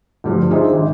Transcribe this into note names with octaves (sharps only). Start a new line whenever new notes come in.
D2 G2 F3
D4 D#4 F4 G#4 C5 E5
G#1